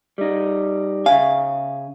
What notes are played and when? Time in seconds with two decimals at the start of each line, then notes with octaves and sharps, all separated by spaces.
0.18 G3 D#4
1.06 C#3 E5 F5 G#5